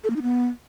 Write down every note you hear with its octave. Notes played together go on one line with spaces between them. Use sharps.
A4
A#3
D#4
B3